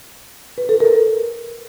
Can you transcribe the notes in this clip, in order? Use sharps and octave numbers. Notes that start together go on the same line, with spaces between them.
B4
A4
A#4